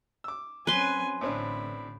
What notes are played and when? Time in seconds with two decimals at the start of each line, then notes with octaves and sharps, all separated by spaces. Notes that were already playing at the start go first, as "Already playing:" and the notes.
0.24 D6 E6
0.67 F#3 C4 C#4 B4 G#5 C6
1.21 A1 A2 D3 C4 D4 B5